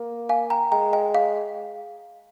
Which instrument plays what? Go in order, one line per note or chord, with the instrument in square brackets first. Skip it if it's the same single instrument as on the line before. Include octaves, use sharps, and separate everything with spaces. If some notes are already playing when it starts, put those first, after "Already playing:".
Already playing: [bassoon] A#3
[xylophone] F5 G#5
G5 A#5
[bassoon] G#3 [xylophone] G5 A#5
[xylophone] D#5 G5
F5